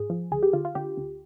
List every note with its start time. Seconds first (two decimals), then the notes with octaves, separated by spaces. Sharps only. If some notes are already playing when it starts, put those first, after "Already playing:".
Already playing: G#2 G#4
0.10 F3
0.31 D2 G#4
0.43 G4
0.53 D3 F4
0.65 F4
0.75 D3 G4
0.97 D2